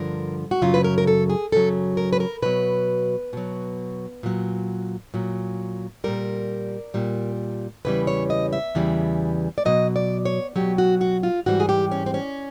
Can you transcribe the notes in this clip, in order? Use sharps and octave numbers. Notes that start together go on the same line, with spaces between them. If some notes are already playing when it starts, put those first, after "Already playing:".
Already playing: G2 D3 F3 A#4
F#4
F#2 C#3 F#3 F4
B4
A#4
A#4
A4
G#4
F#2 C#3 F#3 A4
A#4
B4
A#4
B2 F#3 B4
B2 F#3
A#2 F#3
A#2 F#3
A#2 G3 A#4
A#2 G3
E2 C#3 E3 G3 B4
C#5
D#5
E5
E2 C#3 E3 G3
D5
B2 F#3 D#5
D5
C#5
B2 F#3 G4
F#4
F#4
F4
G#2 E3 G3 F#4
G#4
G4
C#4
C4
C#4